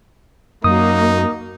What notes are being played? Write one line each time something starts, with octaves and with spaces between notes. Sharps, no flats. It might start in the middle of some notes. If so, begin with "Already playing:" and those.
F#2 A#3 D#4 F#4 D#6